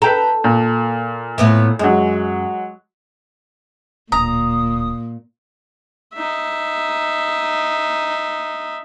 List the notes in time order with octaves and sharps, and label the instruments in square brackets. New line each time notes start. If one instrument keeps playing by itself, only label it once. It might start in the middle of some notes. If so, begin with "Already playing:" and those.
[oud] A4 [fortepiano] B4 G5 A#5
[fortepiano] A#2
[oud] A2 B3 E4
[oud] F#2 [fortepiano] F#3 G#3
[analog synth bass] D1 [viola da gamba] A#2 [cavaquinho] A#5 [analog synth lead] D#6
[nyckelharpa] D#4 E5